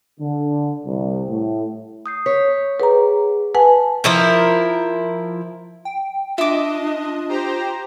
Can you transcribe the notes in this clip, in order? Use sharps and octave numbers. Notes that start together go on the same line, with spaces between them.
D3
C2
A2
D#6 G6 C7
C#5 B6
G#4 B4 F#5 A#5
B4 F#5 G#5 A5
F3 E4 A#4
G5
D4 F4 D#5 E5 D6
G4 C5 A#5